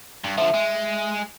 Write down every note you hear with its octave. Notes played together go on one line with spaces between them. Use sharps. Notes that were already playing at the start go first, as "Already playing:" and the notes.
G2
D3 F3 E5
G#3